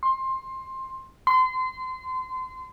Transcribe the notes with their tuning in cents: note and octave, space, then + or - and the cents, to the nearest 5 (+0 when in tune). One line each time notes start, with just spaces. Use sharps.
C6 +15
C6 -25